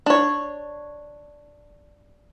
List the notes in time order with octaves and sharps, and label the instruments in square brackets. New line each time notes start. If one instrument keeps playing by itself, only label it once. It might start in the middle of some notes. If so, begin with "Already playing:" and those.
[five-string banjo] D4 C#5